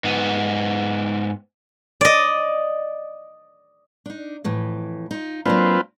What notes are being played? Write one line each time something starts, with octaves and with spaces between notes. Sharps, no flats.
G#2 B3
D5 D#5
D4 D#4
F2 A2 E3
D#4 F4
F#3 A#3 C4 D4 F4 B4